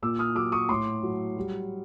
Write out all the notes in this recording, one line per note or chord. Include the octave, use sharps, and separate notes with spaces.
A#2 D6 E6
D#6 F6
F#3 D6 E6
C#6 D#6
A2 C6 D6
F#3
G3